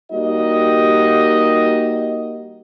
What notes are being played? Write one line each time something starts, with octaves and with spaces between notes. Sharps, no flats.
G3 A#3 D#4 F#4 G4 D#5